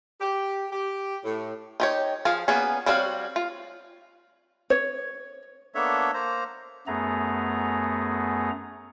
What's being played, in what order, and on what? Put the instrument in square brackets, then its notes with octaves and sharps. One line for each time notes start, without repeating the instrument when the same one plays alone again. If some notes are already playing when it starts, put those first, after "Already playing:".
[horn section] G4
G4
A2
[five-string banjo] D#4 G4 C#5
F3 G#4 F5
A#3 B3 C#4 G#4
G3 C4 F#4 C#5 F5
F4
[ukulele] C#5
[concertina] A#3 B3 D4 A4 C#5 E5
A#3 C5 A#5
[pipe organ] F#2 A3 B3 G#4 A#5